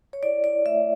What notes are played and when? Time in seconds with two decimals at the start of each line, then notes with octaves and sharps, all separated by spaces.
0.13 C#5
0.23 E4 D5
0.44 E4 D5
0.66 A3 E5